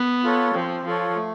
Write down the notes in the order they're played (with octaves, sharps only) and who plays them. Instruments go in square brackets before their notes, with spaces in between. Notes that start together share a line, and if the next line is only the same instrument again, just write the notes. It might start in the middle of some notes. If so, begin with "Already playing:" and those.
Already playing: [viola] B3
[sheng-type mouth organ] F4 A4 C#5
[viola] F3 [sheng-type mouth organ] C4
[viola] F3 [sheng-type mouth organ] F4 A4 C#5
[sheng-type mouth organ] A3